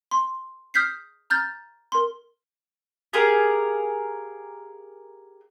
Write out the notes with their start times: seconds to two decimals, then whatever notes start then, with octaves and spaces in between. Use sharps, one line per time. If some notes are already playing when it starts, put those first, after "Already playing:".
0.11 C6
0.74 D#6 F6 G6 B6 C7
1.30 A#5 F6 G6 A6
1.92 A#4 C6
3.13 G4 G#4 A#4 F5